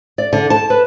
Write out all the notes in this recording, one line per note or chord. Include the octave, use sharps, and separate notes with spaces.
D5
D3
A5
B4